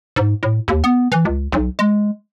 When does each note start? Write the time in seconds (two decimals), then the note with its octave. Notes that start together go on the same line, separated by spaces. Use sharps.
0.16 G#2
0.43 A2
0.68 D#2
0.84 B3
1.12 E3
1.25 C#2
1.52 B1
1.79 G#3